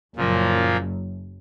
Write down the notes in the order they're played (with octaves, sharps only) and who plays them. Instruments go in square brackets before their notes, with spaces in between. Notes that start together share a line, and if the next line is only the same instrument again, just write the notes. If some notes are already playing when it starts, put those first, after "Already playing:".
[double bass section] F#1 F#2 [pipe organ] A#2 F3 A#3